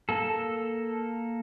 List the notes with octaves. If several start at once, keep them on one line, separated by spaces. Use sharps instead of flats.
A#3 A4